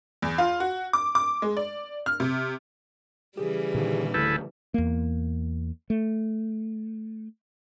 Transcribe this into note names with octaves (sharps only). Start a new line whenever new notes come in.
E2
F4
F#4
D6
D6
G#3
D5
F6
C3
C#3 E3 G3 G4 G#4
A#2 D3 D#3
D1 D3 A3 E4 A4 B4 F6 G6
E2 A#3
A3